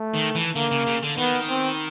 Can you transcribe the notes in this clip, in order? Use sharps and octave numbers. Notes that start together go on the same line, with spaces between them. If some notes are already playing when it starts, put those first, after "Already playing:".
Already playing: A3
D#3
E3
D3 A#3
C#3
C#3
D3
D#3 B3
C4